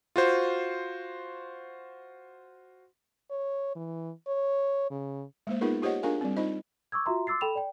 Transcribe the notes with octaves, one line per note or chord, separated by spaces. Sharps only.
F4 F#4 C5
C#5
E3
C#5
C#3
G#3 A#3 C5
B3 D#4 F4 G#4 A#4 B4
F4 G4 C5 C#5 D#5 F#5
D4 F4 G#4 A#4 F5 G#5
G3 C4
D#4 F4 C5 D#5
C#6 D6 E6 G#6
F4 F#4 E5 A#5 C6
C6 D6 E6 A6 C7
A4 G5 B5 E7 F7
D5 G5